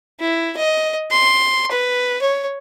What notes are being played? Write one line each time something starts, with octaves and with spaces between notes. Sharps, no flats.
E4
D#5
C6
B4
C#5